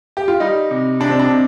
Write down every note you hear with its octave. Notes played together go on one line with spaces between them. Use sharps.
G4
F4
G3 D#4
C3
C3 D4
C4
D4
C3